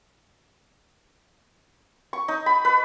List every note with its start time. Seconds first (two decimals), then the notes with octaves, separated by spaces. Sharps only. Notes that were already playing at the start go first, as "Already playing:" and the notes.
2.13 C#6
2.28 D#4
2.46 B5
2.65 B4